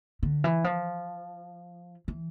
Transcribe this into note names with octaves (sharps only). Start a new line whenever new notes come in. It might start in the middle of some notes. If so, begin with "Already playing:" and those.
D3
E3
F3
E3